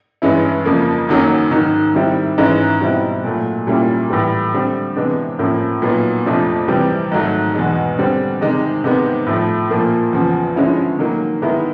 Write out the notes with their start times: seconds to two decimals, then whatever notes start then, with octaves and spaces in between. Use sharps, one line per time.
0.22 G2 E3 G#3 C#4 E4
0.65 F2 C#3 F3 A#3
1.09 F#2 D#3 F#3 A#3 C#4
1.51 G#2 D#3 F#3
1.95 D#3 G3 C4 E4
2.38 G#2 E3 G#3 C#4 E4
2.80 B2 G3 C4 E4
3.24 A#2 F#3 A3
3.67 A#2 G3 A#3 C#4 E4
4.10 A2 E3 G3
4.54 D3 G3 C4
4.96 C3 E3 G#3 B3 D4
5.39 A2 F3 A#3 C#4
5.82 A#2 F#3 B3 D#4
6.26 F2 C3 F3 A3 D4
6.68 C3 E3 G3 C4
7.11 G#2 D#3 F#3 A3
7.54 E2 B2 G#3
7.98 D3 G3 C4
8.41 C3 D#3 G#3
8.84 C3 D#3 G#3 B3
9.26 A2 F3 A3
9.70 A#2 F3 A#3
10.13 E2 C#3 F3
10.56 D3 F3 G#3 C#4 E4
10.99 D#3 F#3 A#3
11.42 D#3 G#3 B3 E4